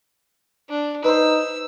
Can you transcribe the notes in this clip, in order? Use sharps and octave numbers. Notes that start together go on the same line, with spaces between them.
D4
D#4 B4 C5 E6